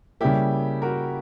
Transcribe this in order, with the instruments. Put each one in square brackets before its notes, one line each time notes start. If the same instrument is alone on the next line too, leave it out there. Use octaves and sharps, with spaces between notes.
[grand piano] C#3 G3 A#3 [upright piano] E4 G4
[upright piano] F#4 A#4